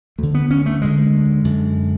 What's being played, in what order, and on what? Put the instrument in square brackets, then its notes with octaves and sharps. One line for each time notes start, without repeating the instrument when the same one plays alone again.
[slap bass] D2 D3 A3
B3
C#4
A3
D2 D3 G#3
F#2 D3